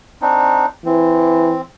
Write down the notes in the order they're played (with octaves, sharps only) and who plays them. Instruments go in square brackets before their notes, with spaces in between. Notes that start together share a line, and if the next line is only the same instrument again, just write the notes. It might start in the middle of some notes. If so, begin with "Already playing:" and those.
[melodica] C4 D4 D#4
[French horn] E3 [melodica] C4